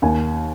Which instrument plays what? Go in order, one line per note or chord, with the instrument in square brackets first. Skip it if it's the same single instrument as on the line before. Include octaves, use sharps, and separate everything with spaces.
[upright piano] D#2 G#5